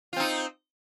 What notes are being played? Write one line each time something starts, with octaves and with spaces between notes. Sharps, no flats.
C4 D#4 F4